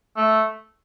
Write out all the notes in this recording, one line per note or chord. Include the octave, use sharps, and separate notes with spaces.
A3